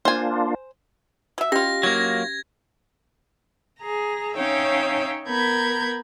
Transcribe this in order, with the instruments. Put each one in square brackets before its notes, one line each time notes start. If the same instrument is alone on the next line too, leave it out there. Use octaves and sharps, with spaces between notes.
[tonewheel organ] A#3 D4 F4 [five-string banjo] C5 G#5
[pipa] F#3 E5
[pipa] B2 F4 [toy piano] C#4 G4 [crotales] A#6
[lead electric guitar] F#3 A#3 [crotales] G#6
[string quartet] G#4 A#5
C#4 D#4 C#5 E5 F5 G5
B3 A#4 B5 G6 G#6